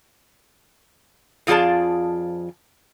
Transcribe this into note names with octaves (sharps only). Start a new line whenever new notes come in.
F2 F3 F4 G#4 D5 A5